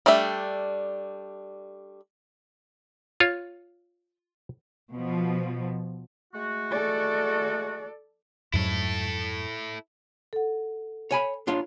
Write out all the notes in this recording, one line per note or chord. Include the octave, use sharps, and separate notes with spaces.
G3 A3 D4 E5
F4 C#5
B2 F3
G#3 A3 F#4
A4 D5
F2 G#2 F#3 E4 A4
A4 F#5
C#5 G#5 B5
D4 F4 C#5